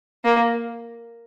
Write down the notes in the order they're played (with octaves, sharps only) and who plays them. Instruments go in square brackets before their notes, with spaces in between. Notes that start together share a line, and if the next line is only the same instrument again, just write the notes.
[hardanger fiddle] A#3